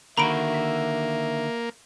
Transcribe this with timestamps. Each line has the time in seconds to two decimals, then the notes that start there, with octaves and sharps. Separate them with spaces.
0.17 D3 D#3 A#3 F#4 E5 A#5 B5 D7
0.54 B6